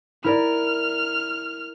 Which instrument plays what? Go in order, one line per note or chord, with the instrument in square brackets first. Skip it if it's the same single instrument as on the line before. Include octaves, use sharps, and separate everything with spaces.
[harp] E4 A#4 D5 [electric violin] F6